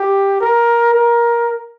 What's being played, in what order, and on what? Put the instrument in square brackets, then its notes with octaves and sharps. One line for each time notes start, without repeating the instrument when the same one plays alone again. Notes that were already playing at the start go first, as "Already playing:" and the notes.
Already playing: [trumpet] G4
A#4
A#4